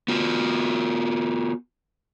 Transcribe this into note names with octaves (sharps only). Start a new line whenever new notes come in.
B3 F4 F#4